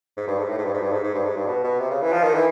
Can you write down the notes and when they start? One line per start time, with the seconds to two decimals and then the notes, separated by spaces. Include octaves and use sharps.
0.17 G#2
0.27 G2
0.39 G#2
0.49 A2
0.58 G#2
0.65 G2
0.74 G#2
0.82 G2
0.92 G#2
1.04 G#2
1.15 G2
1.25 G#2
1.36 G2
1.47 B2
1.64 B2
1.79 C3
1.91 C#3
2.02 E3
2.13 F3
2.23 D#3
2.35 E3